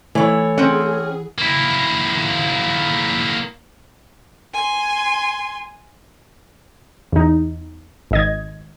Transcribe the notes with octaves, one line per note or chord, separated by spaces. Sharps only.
E3 A3 E4 C#5
C4 C#4 G#4 F#5
A#3 E4
G#5 C6
E2 D#4
G#1 D#5 G#6